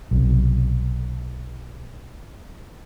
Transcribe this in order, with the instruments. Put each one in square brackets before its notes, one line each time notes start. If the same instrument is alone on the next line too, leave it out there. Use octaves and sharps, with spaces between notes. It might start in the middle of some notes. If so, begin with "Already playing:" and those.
[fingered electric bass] B1 C3